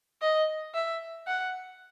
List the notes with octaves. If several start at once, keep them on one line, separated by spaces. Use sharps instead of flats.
D#5
E5
F#5